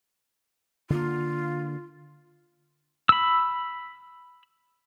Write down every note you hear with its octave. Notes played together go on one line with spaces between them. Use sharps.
D3 A#3 F4
B5 E6